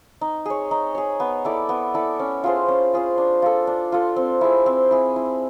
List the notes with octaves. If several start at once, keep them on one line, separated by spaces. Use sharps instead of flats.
D#4
G#4 C#5
D#4
G#4 C#5
B3
E4 A4 D5
B3
E4 A4 D5
C#4
F4 G#4 C5
C#4
F4 G#4 C5
D4
F4 A4
D4
F4 A4
C4
E4 G#4
C4
E4 G#4
E4